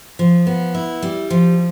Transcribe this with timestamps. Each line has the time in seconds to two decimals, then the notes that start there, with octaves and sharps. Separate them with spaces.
0.19 F3
0.47 B3
0.74 E4
1.02 G3
1.30 F3